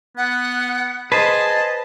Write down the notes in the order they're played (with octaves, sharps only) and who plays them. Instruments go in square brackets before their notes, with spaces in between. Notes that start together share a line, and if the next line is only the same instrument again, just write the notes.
[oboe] B3 [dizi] F#5
[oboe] G#4 [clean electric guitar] B4 C5 [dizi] D#5 [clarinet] A5